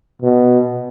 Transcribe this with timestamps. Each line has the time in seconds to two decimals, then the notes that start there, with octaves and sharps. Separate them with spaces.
0.22 B2